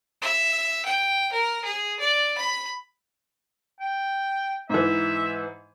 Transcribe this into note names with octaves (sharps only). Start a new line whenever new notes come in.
E5
G5
A#4
G#4
D5
B5
G5
G#2 E3 E5